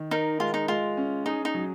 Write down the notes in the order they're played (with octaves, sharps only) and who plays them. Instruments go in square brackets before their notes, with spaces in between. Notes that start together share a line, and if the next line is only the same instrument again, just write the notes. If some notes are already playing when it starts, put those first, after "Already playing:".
Already playing: [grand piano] D#3
[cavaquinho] D#4 [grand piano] A#4
[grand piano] G#3 [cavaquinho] F4
[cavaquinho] D#4
[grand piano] G#3 [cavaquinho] F4
[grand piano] C#4
[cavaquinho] D#4 [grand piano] G#4
[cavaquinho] D#4
[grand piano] F#3